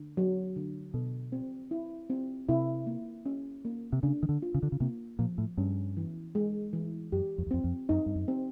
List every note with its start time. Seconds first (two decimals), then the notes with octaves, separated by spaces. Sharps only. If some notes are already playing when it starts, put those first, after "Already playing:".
Already playing: D3
0.17 F#3
0.56 D3
0.94 B2 A4
1.32 C4
1.71 E4
2.10 C4
2.49 C3 E4
2.87 A#3
3.26 C#4
3.65 A#3
3.92 C3
4.03 C#3 D4
4.23 D#3
4.29 D3
4.42 F4
4.54 C#3
4.63 D3
4.72 C#3
4.80 C3 A#3
5.19 A#2 F3
5.38 A2
5.57 G2 C#4
5.97 E3
6.35 G#3
6.73 E3
7.12 F#2 G4
7.38 F2
7.47 E2
7.51 F2 C4
7.64 F2
7.89 F#2 D#4
8.06 G2
8.16 F#2
8.28 C4